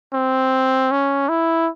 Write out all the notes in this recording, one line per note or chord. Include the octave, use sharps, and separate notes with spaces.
C4
C#4
E4